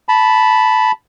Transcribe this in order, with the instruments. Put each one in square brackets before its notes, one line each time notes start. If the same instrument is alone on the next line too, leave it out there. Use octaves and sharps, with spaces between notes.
[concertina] A5 B5